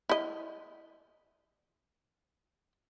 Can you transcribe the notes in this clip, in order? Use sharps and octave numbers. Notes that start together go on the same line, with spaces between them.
E4 D#5